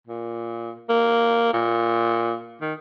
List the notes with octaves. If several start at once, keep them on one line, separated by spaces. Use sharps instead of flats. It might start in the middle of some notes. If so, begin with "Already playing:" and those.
A#2
A#3
A#2
D#3